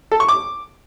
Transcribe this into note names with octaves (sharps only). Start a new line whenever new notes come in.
A4
C#6
D6